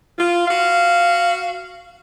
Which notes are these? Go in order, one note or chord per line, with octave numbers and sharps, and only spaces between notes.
F4
F#4 F5